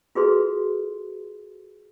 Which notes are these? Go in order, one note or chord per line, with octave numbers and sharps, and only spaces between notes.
F4 F#4 G#4 A4 B4 C6